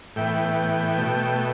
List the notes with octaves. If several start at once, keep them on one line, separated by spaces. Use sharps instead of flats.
A2 E3 B3 G5
B2 A3